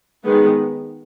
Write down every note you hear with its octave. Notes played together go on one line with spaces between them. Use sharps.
D#3 G#3 B3